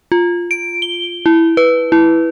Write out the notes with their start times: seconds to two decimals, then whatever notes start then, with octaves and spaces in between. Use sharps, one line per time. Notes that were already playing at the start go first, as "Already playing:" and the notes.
0.12 F4
0.51 D7
0.82 G7
1.26 E4
1.57 B4
1.92 E4